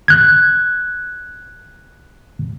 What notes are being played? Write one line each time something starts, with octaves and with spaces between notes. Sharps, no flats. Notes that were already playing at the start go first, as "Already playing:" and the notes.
F#6 G#6